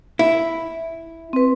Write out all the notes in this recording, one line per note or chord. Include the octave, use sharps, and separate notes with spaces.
E4
C4 B4